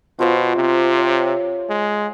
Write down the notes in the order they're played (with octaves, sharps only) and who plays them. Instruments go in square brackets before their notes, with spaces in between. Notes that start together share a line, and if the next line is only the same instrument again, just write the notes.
[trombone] B2 [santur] F4 C5 F5
[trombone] C3
[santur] C#5
[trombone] G#3